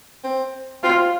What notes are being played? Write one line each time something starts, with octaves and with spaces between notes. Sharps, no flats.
C4
C4 F4